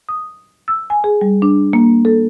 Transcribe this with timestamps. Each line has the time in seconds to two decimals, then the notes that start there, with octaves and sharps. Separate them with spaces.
0.09 D#6
0.68 E6
0.90 G#5
1.04 G#4
1.21 G3
1.42 D4
1.73 A#3
2.05 A4